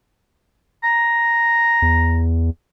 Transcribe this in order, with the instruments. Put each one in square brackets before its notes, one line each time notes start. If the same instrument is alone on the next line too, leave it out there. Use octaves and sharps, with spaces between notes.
[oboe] A#5
[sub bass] E2